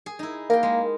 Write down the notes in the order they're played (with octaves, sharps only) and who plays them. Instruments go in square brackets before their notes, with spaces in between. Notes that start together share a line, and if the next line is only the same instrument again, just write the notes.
[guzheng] G#4
D#4 E4
[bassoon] A#3 [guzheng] A#4 G5
[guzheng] G#3